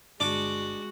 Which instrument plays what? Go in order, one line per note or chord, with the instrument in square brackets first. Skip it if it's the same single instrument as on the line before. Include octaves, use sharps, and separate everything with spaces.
[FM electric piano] G1 [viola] G#3 [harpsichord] D4 D6 [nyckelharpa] F#4